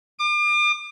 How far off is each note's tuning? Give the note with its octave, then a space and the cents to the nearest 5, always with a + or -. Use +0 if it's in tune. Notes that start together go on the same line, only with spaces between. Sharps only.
D6 +40